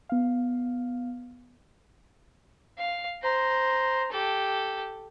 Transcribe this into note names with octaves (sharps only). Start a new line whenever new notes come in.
B3 F5
F5
C5 A#5
G4 A4